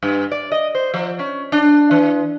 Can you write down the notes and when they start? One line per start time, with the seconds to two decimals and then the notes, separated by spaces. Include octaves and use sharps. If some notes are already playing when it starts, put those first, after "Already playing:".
0.03 G2
0.31 D5
0.52 D#5
0.75 C5
0.94 F3
1.19 C#4
1.52 D4
1.91 E3